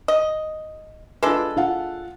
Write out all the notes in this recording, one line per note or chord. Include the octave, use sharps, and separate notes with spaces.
D#5
G#3 D4 F4 A4 B4
F4 F5 F#5